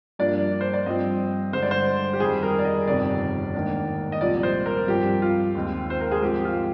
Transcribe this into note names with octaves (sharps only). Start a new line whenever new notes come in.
G2 F3 A#3 D4 D5
C5
D5
G2 F3 C4 D#5
G2 D3 G#3 C5
D5
C5
G4
F2 D#3 G3 G#4
A#4
D5
D#5
G1 F2 C3 D#3 D5
G#2 D#3 A#3 D4
D#5
C2 A#2 F3 D5
C5
A#4
G2 F3 C4 G4
F4
D#2 D#3 G#3 C4
C5
A#4
G#4
G#2 F3 C4 G4
F4